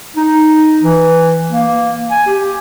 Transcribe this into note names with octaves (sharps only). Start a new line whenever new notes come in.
D#4
E3
A#3
G#5
G4